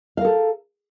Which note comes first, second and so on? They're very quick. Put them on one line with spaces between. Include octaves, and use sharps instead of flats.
F5 A#4 A4